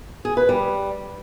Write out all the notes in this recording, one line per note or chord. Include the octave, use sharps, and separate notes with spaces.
G#4
B4
G3